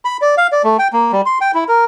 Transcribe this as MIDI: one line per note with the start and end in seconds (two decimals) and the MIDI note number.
0.05 0.17 83
0.22 0.35 74
0.38 0.47 77
0.52 0.62 74
0.64 0.77 57
0.79 0.88 79
0.93 1.12 58
1.12 1.21 55
1.26 1.38 84
1.41 1.51 79
1.54 1.64 64
1.68 1.85 70